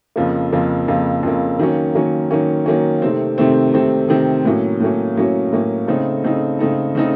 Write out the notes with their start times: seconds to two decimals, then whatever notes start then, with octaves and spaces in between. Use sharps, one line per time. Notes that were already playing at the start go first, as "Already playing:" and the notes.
0.16 F2 C#3 F3 A#3
0.52 F2 C#3 F3 A#3
0.87 F2 C#3 F3 A#3
1.23 F2 C#3 F3 A#3
1.59 D#3 F#3 A#3 C#4
1.95 D#3 F#3 A#3 C#4
2.31 D#3 F#3 A#3 C#4
2.66 D#3 F#3 A#3 C#4
3.02 C3 D#3 A3 C4
3.38 C3 D#3 A3 C4
3.74 C3 D#3 A3 C4
4.09 C3 D#3 A3 C4
4.45 A2 F#3 A#3 C#4
4.80 A2 F#3 A#3 C#4
5.17 A2 F#3 A#3 C#4
5.52 A2 F#3 A#3 C#4
5.87 C#3 A3 C4 D#4 A4
6.24 C#3 A3 C4 D#4 A4
6.59 C#3 A3 C4 D#4 A4
6.95 C#3 A3 C4 D#4 A4